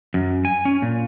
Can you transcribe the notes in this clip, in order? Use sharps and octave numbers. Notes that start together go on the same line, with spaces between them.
F#2
G#5
C#4
A#2